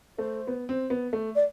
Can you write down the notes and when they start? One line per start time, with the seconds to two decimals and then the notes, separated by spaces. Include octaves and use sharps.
0.17 A3 C5
0.47 B3
0.69 C4
0.90 B3
1.13 A3
1.35 D5